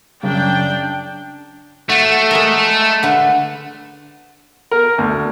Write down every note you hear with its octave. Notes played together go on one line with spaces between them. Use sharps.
F#2 C#3 D4 G5
A3 F#4
G#3 A#4
D3 B4
A#4
D2